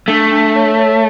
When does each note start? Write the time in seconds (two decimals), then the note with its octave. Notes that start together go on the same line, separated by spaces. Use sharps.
0.08 A3 D4
0.32 D4
0.56 C#5
0.79 C#5